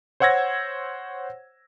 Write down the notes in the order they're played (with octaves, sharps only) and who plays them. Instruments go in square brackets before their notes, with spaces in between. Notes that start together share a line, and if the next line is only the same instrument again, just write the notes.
[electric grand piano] C5 C#5 F#5 E6 G#6 A#6